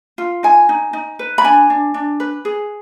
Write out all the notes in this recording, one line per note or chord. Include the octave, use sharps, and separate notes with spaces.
F4
D#4 G#5
D#4
D#4
B4
B5
D4 G#5
D4
D4
B4
G#4